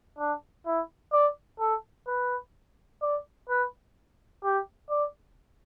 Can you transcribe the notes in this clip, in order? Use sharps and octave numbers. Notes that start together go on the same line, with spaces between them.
D4
E4
D5
A4
B4
D5
B4
G4
D5